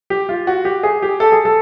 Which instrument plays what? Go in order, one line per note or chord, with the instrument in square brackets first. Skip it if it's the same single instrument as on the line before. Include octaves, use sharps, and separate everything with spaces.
[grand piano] G4
F4
F#4
G4
G#4
G4
A4
G#4
A4